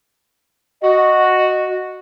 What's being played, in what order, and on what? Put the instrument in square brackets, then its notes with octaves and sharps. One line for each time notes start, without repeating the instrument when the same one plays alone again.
[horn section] F#4 [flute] D#5